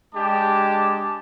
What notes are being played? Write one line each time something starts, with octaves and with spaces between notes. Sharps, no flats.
G#3 D4 G4 A5 D6